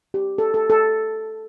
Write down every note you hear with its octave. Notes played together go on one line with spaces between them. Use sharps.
G4
A4
A4
A4